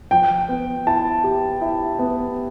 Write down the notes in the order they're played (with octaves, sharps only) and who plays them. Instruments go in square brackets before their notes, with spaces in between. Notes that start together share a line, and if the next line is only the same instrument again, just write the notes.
[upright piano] F3 [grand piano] G5
[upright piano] B3
[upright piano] E4 [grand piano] A5
[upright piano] G4
E4
B3